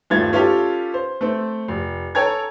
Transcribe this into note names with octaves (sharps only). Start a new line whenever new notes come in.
D#1 G2 A3 F4 G#6 A6
C#4 F4 G4 A4
C5
A3 C4
F1
A4 C#5 G5 G#5 A#5 G#6